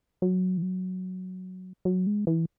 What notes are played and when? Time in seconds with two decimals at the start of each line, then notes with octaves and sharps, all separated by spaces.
0.22 F#3
0.57 E3
0.62 F#3
1.85 F#3
2.07 G#3
2.27 E3